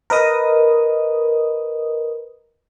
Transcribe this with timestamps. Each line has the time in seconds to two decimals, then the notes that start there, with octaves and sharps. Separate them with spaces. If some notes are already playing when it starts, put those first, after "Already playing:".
0.10 A#4 B4 D#5 D#6